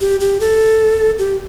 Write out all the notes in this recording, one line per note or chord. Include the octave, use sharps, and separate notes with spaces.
G4
G4
A4
G4